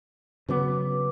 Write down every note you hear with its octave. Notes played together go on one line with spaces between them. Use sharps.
C#3 F#3 B3 B4 D6